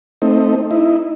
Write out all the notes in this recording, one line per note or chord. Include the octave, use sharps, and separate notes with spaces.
A3 C4 D#4
D#4 E4